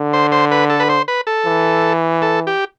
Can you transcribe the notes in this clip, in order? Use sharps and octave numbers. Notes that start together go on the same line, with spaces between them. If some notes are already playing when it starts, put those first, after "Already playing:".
Already playing: D3
C5
C5
B4
A4
B4
C5
B4
A4
E3
A4
G4